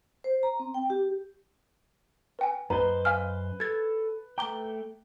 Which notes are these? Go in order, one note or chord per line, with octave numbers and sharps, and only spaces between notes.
C5
A#5
C4
G5
G4
B4 G5 G#5
F#2 B4 C5 D#5 A#5
F5 G#5 F6
A4 G#6 A6
A3 G5 A#5 D6 G7